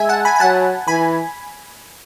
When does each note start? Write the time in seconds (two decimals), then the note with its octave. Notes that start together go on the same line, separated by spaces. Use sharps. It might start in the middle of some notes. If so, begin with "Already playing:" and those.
Already playing: G#3 E5 G#5
0.09 F#5 A5
0.25 G#5 B5
0.36 G#5
0.40 F#3 F#5 A5
0.88 E3 G#5 B5